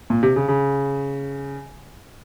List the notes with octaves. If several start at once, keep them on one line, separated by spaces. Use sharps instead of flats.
A#2
C3
C#3
C#3